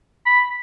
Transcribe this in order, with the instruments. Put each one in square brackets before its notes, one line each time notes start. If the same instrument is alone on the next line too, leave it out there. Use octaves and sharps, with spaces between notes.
[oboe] B5